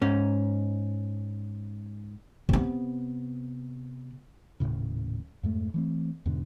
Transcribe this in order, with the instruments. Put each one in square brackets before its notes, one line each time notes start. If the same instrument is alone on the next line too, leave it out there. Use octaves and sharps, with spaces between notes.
[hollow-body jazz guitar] G#2 C#4
[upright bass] C3 B3
[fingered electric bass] D#1 B1 A2 C#3
F2 G#2 A3
E3 A3 C4
E2 G#2 B2 D3